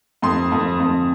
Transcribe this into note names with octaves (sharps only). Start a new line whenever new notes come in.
F2 C6
F2
F2